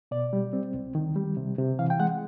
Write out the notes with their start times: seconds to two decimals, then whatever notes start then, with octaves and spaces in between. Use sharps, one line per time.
0.11 B2 D5
0.33 G3
0.53 C4
0.74 C2
0.95 D#3
1.16 G3
1.37 C3
1.58 C3
1.79 E3 F5
1.90 G5
2.00 G#3 F#5